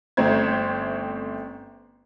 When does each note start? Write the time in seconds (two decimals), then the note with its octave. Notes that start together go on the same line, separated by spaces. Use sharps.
0.17 G1 A3 C4 C#4 C5 G#6